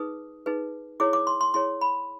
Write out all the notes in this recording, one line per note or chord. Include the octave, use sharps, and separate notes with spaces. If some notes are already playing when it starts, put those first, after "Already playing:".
Already playing: D#4 G#4 B4 D#6
D#4 G#4 B4
E4 G#4 C#5 D6
D6
C6
C6
E4 G#4 C#5 C6
B5